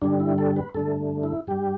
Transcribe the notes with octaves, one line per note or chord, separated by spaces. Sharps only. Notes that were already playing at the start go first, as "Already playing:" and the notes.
G2 D3 G3 D4
E4
A4
B4
G2 D3 A3 A4
E4
G2 G3 G4